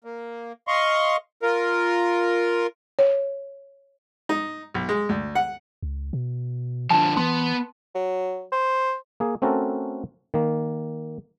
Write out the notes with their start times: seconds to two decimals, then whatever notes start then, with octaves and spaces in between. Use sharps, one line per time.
0.04 A#3
0.68 D#5 F5 C6 C#6
1.42 F4 A#4
2.99 C#5
4.29 D#4
4.74 B1
4.89 G#3
5.09 D2
5.35 F#5
5.83 C#2
6.13 B2
6.90 D3 F3 A5
7.17 E3 B3 C6
7.95 F#3
8.52 C5
9.20 A#3 G#4
9.42 A3 C4 C#4 F#4 A4 A#4
10.34 D#3 A#3